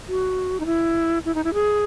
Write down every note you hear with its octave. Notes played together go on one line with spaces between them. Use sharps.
F#4
D#4
E4
E4
D#4
E4
G#4